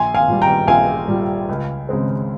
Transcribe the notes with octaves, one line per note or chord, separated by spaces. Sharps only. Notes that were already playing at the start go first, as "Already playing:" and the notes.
Already playing: A#1 G#5 C6
F5 G#5
A#2 G3
G5 A#5
A#1 F5 G#5
A#2 G3
C#2
C#3 G#3 C4